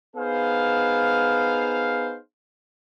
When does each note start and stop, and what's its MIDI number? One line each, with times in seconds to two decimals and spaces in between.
0.16 2.18 59
0.16 2.18 63
0.16 2.18 68
0.16 2.18 72
0.16 2.18 77